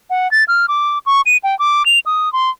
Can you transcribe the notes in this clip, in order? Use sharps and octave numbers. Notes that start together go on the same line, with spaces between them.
F#5
A6
F6
D6
C#6
D#7
G5
D6
F7
D#6
C6